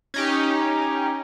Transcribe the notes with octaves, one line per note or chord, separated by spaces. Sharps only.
C#4 D#4 G4